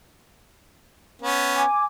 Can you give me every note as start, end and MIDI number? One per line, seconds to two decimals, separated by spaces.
1.22 1.63 59
1.22 1.63 61
1.54 1.84 80
1.54 1.84 86